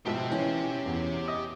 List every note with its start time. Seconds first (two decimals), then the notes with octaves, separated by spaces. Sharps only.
0.06 G#2 B2 F3 G4 E5
0.32 E3 C#4
0.86 E2
1.28 D#5